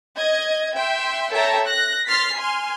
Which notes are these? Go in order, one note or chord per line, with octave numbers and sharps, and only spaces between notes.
D#5 G#6
E5 G5 C6
A4 C#5 E5 G5 A5 A#5
F#6 A#6
C6 F6 A6 B6 C7
G#5 C6 F6